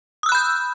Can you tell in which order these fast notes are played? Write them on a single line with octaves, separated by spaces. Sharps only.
D#6 E6 F#6 B5 G6